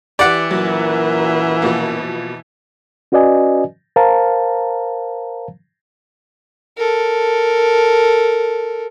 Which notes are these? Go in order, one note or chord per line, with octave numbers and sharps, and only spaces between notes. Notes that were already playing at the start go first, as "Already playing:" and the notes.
E3 G4 D5 F#5
F#2 A#2 F#3
B2 F3 A#3
C#4 F#4 B4 D5 D#5 G#5
A#4 C5 F5 A5 A#5
A4 A#4